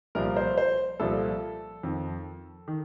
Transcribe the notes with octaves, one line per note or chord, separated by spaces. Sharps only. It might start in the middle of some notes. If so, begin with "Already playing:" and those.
C2 A#2 F3 A#4
C5
C5
C2 A#2 F3 A4
F2 D#3
D#3